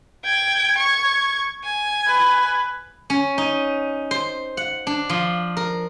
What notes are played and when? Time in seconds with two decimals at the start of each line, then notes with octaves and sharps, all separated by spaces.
0.24 G5 G#6
0.78 C#6 G#6
1.64 G#5
2.07 B4
3.10 C#4
3.38 D#4
4.11 C5
4.57 F#5
4.87 D4
5.10 F3
5.57 A#4